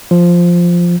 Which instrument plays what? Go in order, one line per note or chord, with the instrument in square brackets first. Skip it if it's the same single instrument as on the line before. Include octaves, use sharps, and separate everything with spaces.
[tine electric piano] F3